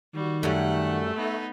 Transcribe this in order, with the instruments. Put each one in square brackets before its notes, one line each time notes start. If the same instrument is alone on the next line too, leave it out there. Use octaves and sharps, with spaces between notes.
[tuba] D#3 [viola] G3 F#4
[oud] F#2 G3 [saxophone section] A3 [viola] F#5
[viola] B3 D#4